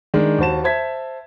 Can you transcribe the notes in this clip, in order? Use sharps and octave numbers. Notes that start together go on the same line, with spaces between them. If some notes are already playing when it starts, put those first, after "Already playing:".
D#3 G#3 D4
D#2 F#4 C5 A5 E7
C5 E5 A5 G#6 B6